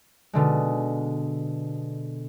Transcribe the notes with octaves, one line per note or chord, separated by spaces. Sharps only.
B2 D3 G#3